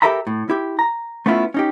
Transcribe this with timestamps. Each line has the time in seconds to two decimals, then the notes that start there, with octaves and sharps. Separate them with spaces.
0.02 G4 A4 A#4 E5 A#5 B5
0.27 A2
0.50 E4 G4
0.79 A#5
1.26 A3 B3 C#4 E4 F4
1.54 C#4 D#4 G4